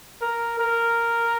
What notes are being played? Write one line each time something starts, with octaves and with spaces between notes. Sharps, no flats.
A#4
A#4